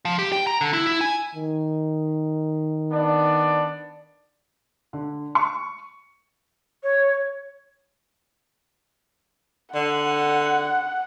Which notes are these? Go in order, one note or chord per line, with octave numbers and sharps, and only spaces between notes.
F3
G4
G5
A#5
D3
E4
E4
G#5
D#3
B3 D4 D5
D3
C#6
C#5
D3 F#5